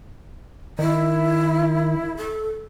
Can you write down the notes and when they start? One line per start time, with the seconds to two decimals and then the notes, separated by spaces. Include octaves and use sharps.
0.79 D#3 E4
2.17 A4